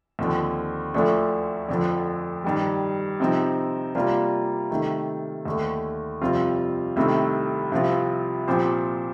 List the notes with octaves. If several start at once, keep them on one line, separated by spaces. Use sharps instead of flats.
D#2 D3 F3 C4
D2 D3 F3 A3 D4
F2 D3 F3
G2 D#3 G3
C3 F3 C4 D#4
C3 G3 A#3 D4 F4
C3 D#3 A3
D#2 D3 A3
F2 C3 G3 C4 F4
C2 C3 D#3 A3 C4
C2 C3 F3 C4 F4
A#2 F3 C4 G4 C5